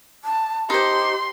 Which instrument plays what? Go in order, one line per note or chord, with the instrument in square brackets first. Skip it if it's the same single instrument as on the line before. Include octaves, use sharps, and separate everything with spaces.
[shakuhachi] A5
[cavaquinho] D#4 C5 [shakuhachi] G4 [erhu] C6